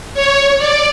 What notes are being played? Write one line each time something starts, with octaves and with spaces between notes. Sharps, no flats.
C#5
D5